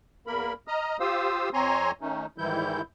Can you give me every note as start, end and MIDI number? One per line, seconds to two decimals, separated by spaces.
0.27 0.53 40
0.27 0.53 58
0.27 0.53 70
0.27 0.53 83
0.68 0.97 75
0.68 0.97 82
0.68 0.97 87
0.68 0.97 89
1.00 1.49 65
1.00 1.49 67
1.00 1.49 72
1.00 1.49 77
1.00 1.49 87
1.00 1.49 88
1.53 1.91 41
1.53 1.91 60
1.53 1.91 73
1.53 1.91 80
1.53 1.91 82
1.53 1.91 84
2.01 2.26 51
2.01 2.26 57
2.01 2.26 61
2.01 2.26 63
2.38 2.81 44
2.38 2.81 51
2.38 2.81 52
2.38 2.81 55
2.38 2.81 64
2.38 2.81 91